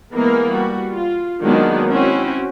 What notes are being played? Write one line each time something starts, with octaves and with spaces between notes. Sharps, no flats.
E3 G#3 A#3 B3 A#4
G3 F#4
F4
D#3 F#3 G#3 A#3 B3 D4
C4 C#4 E4 F#4